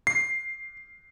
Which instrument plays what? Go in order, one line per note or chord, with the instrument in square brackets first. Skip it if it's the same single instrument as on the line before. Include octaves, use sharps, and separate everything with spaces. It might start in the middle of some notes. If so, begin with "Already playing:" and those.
[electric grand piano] C7